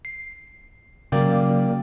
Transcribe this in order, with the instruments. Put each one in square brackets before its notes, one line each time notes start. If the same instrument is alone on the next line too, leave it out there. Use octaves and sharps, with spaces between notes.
[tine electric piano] C7
[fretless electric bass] C#3 F#3 [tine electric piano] A#3 D5 G5